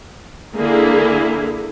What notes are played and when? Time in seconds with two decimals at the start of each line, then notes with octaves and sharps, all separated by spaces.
0.56 D3 A#3 E4 G#4